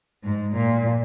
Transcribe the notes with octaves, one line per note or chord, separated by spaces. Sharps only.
G#2
A#2